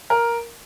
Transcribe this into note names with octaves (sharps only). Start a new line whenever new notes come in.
A#4